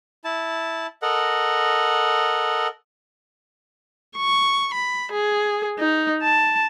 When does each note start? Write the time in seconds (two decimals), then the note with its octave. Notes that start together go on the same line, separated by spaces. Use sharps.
0.24 E4 A5
1.02 A4 A#4 D#5 F#5
4.16 C#6
4.74 B5
5.12 G#4
5.79 D#4
6.23 A5